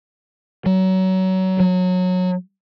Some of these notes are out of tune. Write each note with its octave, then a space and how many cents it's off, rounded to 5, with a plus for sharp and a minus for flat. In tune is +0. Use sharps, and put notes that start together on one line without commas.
F#3 +25
F#3 -20